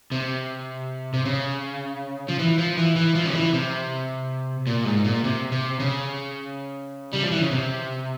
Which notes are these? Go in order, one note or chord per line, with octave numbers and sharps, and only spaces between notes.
C3
C3
C#3
F3
E3
F3
E3
E3
F3
C#3
E3
C3
A#2
G#2
A#2
C3
C3
C#3
G3
F3
E3
C#3
C3